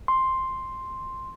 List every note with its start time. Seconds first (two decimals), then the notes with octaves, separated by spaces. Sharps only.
0.08 C6